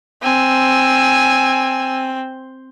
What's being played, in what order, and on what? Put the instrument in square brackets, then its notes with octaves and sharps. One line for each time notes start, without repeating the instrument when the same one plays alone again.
[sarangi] C4 [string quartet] G#5 E6